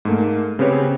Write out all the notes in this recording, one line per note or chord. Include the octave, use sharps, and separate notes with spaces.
G#2 A3 A#3
C#3 B3 C4 G4 B4 C#5